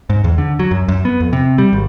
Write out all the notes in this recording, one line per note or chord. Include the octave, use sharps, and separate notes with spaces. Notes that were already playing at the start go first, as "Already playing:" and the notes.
G#2
E2
D3
F#3
F#2
F#2
B3
F2
C3
G3
G#1